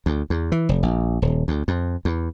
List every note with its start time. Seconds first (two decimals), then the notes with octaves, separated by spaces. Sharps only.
0.06 D2
0.30 E2
0.52 E3
0.69 F1
0.83 A#1
1.22 D#1
1.48 D2
1.68 F2
2.05 E2